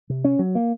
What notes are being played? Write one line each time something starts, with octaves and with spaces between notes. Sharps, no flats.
C3
C#4
F#3
A#3